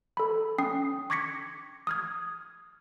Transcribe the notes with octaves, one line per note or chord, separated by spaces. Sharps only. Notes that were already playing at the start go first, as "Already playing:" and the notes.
A4 B5
C#4 G5 D#6 C7
C#6 D6 G#6 A#6 B6 C#7
D#6 F6 G#6